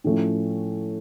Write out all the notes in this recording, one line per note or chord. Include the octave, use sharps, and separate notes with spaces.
A2 F3 A3 C#4